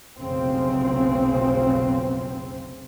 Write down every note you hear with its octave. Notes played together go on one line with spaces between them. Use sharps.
F1 B1 C#3 C4